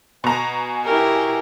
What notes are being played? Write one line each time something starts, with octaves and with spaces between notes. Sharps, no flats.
B2 G#5 A#5
E4 G4 A#4